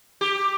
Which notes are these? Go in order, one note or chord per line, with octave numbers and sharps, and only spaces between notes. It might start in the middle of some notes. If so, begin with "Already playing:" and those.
G4